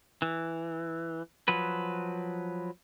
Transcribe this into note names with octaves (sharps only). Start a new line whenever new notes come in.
E3
F3 F#3 B4